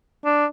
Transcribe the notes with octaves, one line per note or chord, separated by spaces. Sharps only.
D4